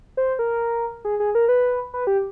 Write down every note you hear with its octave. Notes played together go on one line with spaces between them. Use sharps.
C5
A#4
G#4
G#4
A#4
B4
B4
G4